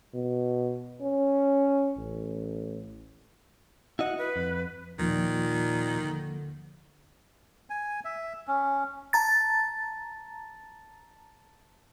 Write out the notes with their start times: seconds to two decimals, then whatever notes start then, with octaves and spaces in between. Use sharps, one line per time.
0.14 B2
1.01 C#4
1.98 A1
3.99 E4 F#4 D#5 F#5
4.18 B4
4.36 F2
4.99 D#2 A#2 D#3 F3 A#3
6.00 D3
7.70 G#5
8.05 E5
8.47 C#4
9.13 A5 A#5 A6